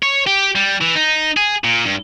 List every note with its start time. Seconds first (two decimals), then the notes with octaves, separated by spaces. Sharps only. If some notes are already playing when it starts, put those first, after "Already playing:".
0.03 C#5
0.27 G4
0.55 G3
0.81 E3
0.95 D#4
1.37 G#4
1.64 A#2
1.85 G2